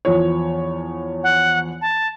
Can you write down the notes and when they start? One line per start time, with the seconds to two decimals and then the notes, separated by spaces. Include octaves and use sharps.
0.05 E2 F3 C#5
1.24 F#5
1.81 A5